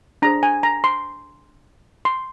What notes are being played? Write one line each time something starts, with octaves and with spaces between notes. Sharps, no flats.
D4 G#4 C5 A#5
G#5
A#5
C6
C6